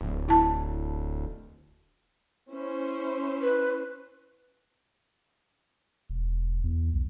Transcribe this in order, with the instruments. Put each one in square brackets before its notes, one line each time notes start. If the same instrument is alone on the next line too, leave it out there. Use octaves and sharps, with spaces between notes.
[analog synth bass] D1
[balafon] E4 A5
[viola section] C#4 E4 C5
[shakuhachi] B4
[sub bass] E1
E2
B1